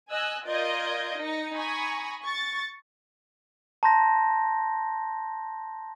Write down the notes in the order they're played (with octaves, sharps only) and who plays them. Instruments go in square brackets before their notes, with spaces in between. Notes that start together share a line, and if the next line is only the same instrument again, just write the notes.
[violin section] D#5 G#5 E6 F#6
F4 A#4 D5 D#5 G6 G#6
D#4 A#6 C#7
G#5 A#5 B5 C#6 D#6
C#6 A6
[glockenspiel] A5 A#5 C6 G6 A#6